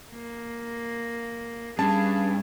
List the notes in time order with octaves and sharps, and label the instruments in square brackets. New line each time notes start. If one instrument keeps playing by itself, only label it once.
[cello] A#3
[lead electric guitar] G2 [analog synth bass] C#4 [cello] G#4 [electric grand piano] A5